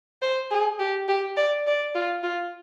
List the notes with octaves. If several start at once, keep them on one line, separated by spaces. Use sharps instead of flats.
C5
G#4
G4
G4
D5
D5
F4
F4